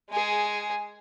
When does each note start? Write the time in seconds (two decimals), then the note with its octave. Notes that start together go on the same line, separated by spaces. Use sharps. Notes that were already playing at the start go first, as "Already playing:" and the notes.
0.11 G#3 G#4